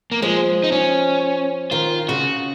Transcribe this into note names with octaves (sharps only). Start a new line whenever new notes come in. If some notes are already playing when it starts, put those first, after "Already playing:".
A#3
F3 G#3
D#4
C#4
D#3 F4
C#3 F#4